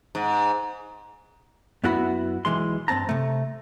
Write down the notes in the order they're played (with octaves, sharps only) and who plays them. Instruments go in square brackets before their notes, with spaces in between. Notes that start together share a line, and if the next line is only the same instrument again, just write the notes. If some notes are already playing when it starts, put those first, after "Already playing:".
[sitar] G#2
[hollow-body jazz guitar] F#2 B3 E4 F#4 F#5 B5
B1 E3 G#3 C6
G2 C3 C4 A5 A#5
C3 A3